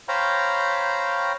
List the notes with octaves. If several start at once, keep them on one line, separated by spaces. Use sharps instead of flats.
C5 C#5 F5 G5 A#5 B5